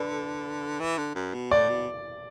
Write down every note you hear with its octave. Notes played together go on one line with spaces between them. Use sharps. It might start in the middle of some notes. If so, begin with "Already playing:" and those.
Already playing: D3 A4 B4 D5
E3
D3
F#2
B2
A2 D5
B2